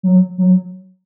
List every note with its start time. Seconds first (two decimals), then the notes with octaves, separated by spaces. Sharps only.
0.03 F#3
0.38 F#3